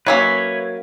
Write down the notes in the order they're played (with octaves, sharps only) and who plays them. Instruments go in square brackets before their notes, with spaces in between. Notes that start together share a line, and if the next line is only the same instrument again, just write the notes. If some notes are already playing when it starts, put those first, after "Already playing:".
[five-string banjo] F#3 A#3 C#4 [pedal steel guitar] B4 C#5 E5